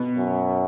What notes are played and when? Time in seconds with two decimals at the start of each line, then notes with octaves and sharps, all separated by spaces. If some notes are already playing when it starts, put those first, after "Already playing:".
Already playing: B2 B3
0.17 F#2